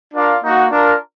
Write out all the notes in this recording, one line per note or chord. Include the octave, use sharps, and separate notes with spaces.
D4 F4 A#4 D5 F5
A#3 D#4 F#4
D4 F4 A#4